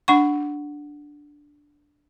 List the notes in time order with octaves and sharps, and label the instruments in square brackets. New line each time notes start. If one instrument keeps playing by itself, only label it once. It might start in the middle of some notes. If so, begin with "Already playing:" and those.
[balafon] D4 F#5 C#6